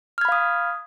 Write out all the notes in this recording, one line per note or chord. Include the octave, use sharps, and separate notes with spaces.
F5 B5 D#6 F6 G#6